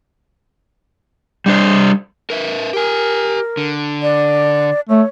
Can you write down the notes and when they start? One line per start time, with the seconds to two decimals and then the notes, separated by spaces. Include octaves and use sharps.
1.46 G3 D4 C5
2.30 A#4 B4 E5
2.73 G4 A#4 G#5
3.57 D3
4.02 D5
4.89 A3 C#5